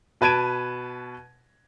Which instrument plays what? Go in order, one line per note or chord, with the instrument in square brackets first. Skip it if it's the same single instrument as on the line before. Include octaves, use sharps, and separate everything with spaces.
[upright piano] B2 B4 A5 G#6 D7 D#7